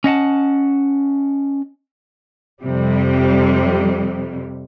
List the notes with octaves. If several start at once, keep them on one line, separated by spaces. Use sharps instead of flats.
C#4 D#5 F#5 A5
F2 C3 G3